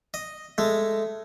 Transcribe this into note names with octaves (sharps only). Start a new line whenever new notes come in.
D#5
G#3 A3